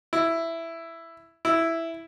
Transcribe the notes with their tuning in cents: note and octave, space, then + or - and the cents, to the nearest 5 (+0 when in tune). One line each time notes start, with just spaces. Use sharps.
E4 +5
E4 +0